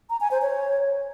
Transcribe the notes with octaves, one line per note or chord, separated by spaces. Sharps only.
A#5
G#5
C5
C#5